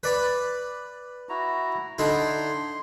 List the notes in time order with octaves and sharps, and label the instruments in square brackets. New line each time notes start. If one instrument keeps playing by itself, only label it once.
[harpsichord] B4 D5 B5
[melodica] E4 F#4 A#5
[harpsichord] D3 D#4 E4 [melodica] C6